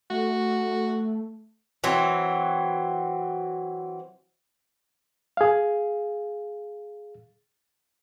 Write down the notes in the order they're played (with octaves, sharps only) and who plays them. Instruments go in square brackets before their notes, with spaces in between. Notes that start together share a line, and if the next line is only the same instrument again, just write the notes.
[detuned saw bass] A3 [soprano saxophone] F#4
[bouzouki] E3 F#3 C4
[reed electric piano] G#4 F5